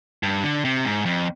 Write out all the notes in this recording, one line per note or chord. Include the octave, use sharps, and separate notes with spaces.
G2
D3
C3
G#2
F2